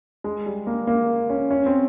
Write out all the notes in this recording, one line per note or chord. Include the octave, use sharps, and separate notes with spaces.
G#3
G3
A#3
A#3
C#4
C#4
C4